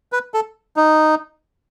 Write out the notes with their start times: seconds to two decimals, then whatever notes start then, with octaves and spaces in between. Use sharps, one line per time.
0.12 B4
0.34 A4
0.76 D#4